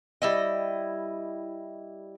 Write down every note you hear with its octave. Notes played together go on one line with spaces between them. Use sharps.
G3 E4 D#5